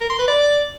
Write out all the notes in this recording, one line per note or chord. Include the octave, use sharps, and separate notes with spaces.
A#4
C6
B4
D5